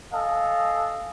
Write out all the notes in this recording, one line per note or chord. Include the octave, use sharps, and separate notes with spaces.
A4 D#5 F5 G#5